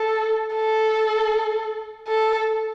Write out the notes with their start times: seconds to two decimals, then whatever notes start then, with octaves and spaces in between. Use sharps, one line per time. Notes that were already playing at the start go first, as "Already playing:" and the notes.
Already playing: A4
0.54 A4
2.08 A4